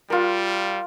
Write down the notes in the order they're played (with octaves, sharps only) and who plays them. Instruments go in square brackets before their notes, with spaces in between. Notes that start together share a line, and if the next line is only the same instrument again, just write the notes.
[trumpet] G3 [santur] F4 A#4